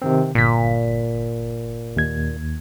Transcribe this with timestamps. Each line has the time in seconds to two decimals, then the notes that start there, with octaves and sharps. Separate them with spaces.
0.02 C3 D#3 C4
0.35 G1 A#2 B6
1.97 D#2 G#6